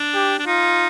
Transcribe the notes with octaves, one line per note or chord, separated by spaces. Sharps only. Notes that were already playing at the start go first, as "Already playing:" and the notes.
Already playing: D4
G4
D4
D#4 F4